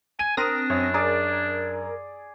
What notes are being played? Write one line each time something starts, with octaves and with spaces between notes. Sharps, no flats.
G#5 D#7
C4 D4 A#4 D#6 A#6
F#2 C#5
G#4 A#4 D5